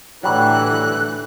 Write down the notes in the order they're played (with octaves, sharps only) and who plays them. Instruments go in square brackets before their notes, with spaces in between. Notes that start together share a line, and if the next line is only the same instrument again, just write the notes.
[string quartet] A2 D3 E3 [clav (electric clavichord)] F#3 G3 [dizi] F#6